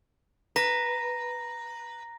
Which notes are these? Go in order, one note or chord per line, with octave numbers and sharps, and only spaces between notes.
B4 A#5 A#6